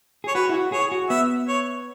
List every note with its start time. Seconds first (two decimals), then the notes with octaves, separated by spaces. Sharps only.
0.24 G#4 C#5
0.35 F#4 B4
0.49 E4
0.54 F#4
0.72 G#4 C#5
0.92 F#4
1.10 B3 E5
1.48 C#5